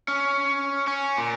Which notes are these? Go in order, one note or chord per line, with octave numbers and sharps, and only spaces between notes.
C#4
C#4
A#2